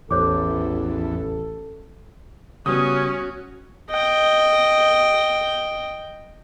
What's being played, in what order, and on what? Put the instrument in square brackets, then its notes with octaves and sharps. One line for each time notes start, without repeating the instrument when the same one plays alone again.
[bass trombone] A1 [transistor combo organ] E2 [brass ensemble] A4 [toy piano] C5 C#5 D6
[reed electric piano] C#3 G3 B3 [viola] C#4 [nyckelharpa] F#4 [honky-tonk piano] D#6
[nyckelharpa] D#5 G5